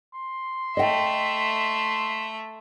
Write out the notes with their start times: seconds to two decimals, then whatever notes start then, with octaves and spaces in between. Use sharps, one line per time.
0.14 C6
0.77 A3 D#5 E5 F#5 G5